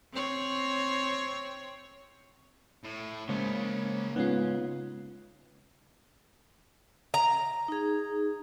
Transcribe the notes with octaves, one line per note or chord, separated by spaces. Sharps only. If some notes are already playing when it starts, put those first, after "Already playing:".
C4 C#5
A2
C#3 G#3 A#3 C5 C#5 B5
G#3 B3 C#4 D#4 F4
A#5
D#4 G#4